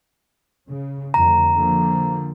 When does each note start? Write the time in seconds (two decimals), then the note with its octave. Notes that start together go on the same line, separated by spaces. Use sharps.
0.69 C#3
1.14 F2 D3 A3 A#5
1.53 D3 F3 A#3